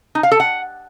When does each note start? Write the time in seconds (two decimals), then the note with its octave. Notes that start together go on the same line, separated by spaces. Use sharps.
0.15 D#4
0.23 F5
0.32 A4
0.40 F#5